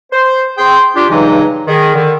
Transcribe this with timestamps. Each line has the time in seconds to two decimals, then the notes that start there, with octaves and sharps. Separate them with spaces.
0.12 C5
0.58 C4 G#4 G5 C6
0.95 D4 F4 G4
1.09 G2 C#3 E3 F#3 G#3 D#4
1.68 D#3 G#4
1.94 D3 D#3